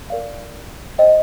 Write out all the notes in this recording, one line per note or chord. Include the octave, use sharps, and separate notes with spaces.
A#4 D5 F5
C5 D#5 G5